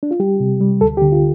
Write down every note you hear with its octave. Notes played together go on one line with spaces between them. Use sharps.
D4
F4
G3 G4
C3
G3
D2 A4
G4
D3
F4